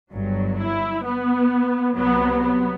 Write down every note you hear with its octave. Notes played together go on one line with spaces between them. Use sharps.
G1 G2 F#3
E4
B3
C2 C3 F#3 B3
B3